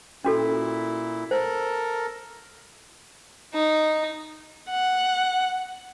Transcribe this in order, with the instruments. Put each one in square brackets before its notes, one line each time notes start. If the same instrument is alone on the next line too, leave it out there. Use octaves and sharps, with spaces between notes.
[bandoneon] A#2 E4 [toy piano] C#4 F#4 A4
[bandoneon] A4 A#4 [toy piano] C5
[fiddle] D#4
[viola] F#5